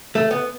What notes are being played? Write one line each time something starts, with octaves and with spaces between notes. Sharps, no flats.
A3
B3